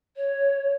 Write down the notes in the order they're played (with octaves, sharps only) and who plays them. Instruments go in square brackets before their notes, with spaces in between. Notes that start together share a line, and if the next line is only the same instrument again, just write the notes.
[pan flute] C#5